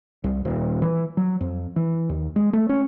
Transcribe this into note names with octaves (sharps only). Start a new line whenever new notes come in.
C2
D#1
E3
F#3
F2
E3
D#2
G#3
A3
C#4